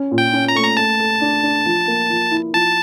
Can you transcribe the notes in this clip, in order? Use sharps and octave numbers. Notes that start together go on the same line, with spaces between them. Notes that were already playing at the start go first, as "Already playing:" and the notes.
Already playing: C#4
A#2
G5
C#4
A#5
A3 C#6
A#5
A3 A5
A4
D4
D4
F3
A#3
F3
E4
F3 A5